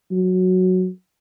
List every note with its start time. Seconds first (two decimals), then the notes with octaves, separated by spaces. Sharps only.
0.11 F#3